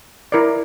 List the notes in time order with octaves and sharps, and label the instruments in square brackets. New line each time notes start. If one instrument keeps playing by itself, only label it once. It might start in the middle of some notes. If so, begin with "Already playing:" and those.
[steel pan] E4 A#4 D5